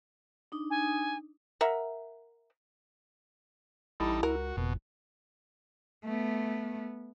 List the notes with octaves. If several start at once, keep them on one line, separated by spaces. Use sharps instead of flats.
D4 D#4 D#6
G#5
A#4 E5 F#5
A1 G3 D#4 E4 A4
C#2 F#4 A#4
F#1 F2 B2
A3 B3